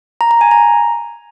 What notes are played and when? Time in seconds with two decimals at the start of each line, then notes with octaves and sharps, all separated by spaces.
0.21 A#5
0.31 A#5
0.41 G#5
0.51 A#5